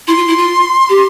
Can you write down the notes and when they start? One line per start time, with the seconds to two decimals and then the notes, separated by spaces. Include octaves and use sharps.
0.07 E4 C6
0.17 F4
0.28 E4
0.38 F4
0.89 G4